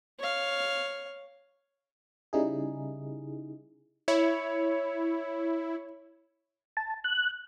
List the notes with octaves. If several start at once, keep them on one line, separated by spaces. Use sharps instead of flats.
C#5 F5
C#3 G3 D#4 E4 G#4
E4 C#5
A5
F#6